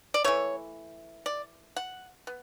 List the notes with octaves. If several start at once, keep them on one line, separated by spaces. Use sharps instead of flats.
D5
E3 A3 C#5
D5
F#5
B3